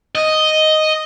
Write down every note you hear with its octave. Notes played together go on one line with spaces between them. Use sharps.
D#5